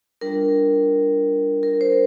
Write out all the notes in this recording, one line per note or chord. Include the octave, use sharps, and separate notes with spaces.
G3 D4 F4 A#4
A#4
C5